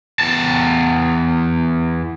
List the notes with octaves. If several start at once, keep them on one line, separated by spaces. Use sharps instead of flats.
E2 A5